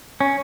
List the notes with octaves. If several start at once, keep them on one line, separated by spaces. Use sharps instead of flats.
C#4